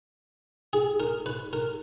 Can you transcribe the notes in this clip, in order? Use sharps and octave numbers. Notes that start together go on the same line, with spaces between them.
G#4
A#4
B4
A#4